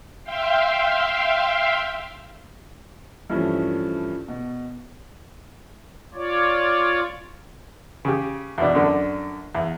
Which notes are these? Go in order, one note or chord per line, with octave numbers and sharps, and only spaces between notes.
E5 F5 G5 C6
G2 E3 F3 A3 C#4
B2
F4 C#5 D5
C#3 G4
E2 B2 D4
F#2 D3 D4
E2